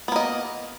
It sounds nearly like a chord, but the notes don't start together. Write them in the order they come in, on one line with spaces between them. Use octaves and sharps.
B3 A#3 D#5